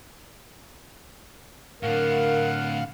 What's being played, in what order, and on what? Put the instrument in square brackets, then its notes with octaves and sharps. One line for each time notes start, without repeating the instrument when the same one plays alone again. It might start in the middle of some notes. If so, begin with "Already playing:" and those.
[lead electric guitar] A2 D3 [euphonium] A#4 [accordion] F5 F#5